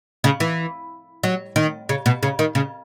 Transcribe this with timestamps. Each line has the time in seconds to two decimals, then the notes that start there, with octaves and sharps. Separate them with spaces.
0.24 C#3
0.40 E3
1.23 F#3
1.56 D#3
1.89 C#3
2.06 B2
2.23 C#3
2.39 D#3
2.55 C#3